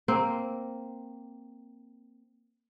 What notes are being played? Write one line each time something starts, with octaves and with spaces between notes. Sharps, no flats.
A#3 C4